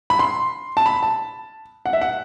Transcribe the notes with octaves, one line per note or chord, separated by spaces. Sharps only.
B5
C6
A5
B5
A5
F#5
E5
F#5